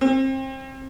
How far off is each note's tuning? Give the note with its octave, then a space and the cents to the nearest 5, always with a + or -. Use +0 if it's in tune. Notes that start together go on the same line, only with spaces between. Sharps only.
C4 +30